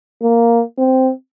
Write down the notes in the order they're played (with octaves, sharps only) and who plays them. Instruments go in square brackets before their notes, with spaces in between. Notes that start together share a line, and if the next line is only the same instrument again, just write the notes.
[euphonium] A#3
C4